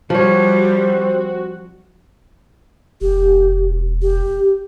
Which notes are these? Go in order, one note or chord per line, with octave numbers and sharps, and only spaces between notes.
F3 G3 C4 F#4 C#5
E1 G4
G4